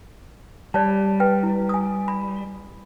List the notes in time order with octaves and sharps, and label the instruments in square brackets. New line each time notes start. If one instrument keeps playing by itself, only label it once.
[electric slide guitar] G3 [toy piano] C#5 D5 A5
[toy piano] B4 G5
E4
G#5 D#6
B5